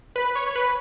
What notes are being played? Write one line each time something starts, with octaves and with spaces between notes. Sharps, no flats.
B4
C#5
B4